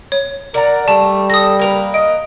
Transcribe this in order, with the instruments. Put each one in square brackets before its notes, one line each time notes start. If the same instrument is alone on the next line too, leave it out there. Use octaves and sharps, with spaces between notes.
[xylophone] C#5
[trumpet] A#4 [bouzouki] D5 F#5 A#5
[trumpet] G3 [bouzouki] A3 [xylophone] A5
[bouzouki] A4 [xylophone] D#6 A#6
[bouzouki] A#3 A#4 B4
[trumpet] D#5 [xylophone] D7